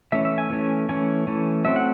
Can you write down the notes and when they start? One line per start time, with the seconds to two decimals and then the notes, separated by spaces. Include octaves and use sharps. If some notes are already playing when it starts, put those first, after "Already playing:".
0.12 E3 A3 C#4 E5
0.25 E5
0.38 G#5
0.50 E3 A3 C#4
0.89 E3 A3 C#4 G#5
1.27 E3 A3 C#4
1.65 F#3 A3 C4 E5
1.76 F#5